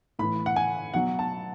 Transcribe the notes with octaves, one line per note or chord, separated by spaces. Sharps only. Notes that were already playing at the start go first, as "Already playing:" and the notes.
A2 E3 B5
F#5
G#5
B2 F#3 F#5
A5